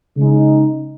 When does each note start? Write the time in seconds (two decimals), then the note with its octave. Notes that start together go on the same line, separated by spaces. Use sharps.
0.17 C#3 G#3 D#4